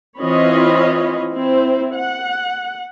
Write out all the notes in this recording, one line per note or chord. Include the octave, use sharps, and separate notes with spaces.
E3 C4 F4 C#5 D#5 B5
C4 E4 C5
F#5